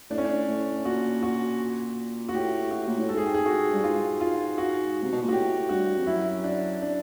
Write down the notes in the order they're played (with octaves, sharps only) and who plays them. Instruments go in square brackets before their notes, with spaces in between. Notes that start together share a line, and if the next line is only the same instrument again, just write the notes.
[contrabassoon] A2 [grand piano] D4
[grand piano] C#4
D4
[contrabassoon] A2
[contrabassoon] A#2 [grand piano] F#4
[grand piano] F#4
F#4
[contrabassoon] A2 [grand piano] G4
[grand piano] F#4
[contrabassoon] A#2
A2
[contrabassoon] G#2 [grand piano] A4
[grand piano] G#4
G4
G#4
F#4
[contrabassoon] G2
[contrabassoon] G#2 [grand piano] F4
[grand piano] F4
F#4
[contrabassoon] C3
B2
A#2
[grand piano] F#4
[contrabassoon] A2 [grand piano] G4
[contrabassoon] G2 [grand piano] F#4
[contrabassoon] F2
[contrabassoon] F#2 [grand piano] E4
[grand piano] D4
D4